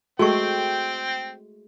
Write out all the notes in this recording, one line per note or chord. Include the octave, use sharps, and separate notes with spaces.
G#3 A3 C4 F#4 G5 C#6